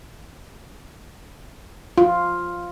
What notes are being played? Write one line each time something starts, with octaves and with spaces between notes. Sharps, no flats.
F4